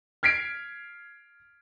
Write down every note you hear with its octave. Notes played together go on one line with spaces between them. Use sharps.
F6 G#6 B6 C7 D7